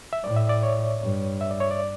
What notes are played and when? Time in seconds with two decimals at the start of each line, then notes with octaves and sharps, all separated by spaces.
0.13 E5
0.23 A2 D5
0.36 E5
0.49 D5
0.63 C#5
1.02 G2
1.41 E5
1.51 D5
1.60 C#5
1.71 D5